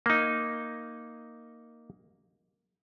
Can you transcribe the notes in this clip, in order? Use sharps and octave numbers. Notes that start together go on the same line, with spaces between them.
A#3 D#4